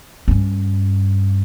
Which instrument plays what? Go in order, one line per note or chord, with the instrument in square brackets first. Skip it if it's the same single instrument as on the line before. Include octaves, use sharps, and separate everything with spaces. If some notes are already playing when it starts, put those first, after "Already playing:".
[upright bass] G2 C#4